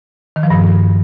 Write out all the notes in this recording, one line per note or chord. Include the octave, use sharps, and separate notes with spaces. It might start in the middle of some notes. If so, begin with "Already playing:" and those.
D#3
F3
G2